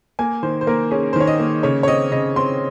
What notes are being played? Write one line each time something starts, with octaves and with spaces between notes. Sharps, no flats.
A#3 G#5
D#3 C5
C5
A#3 A#4
C#4 G#4
C5
D#3 C#5
D#5
A#3
C#3 C#5
C#5
C4 D#5
C#3 D#5
C4 C6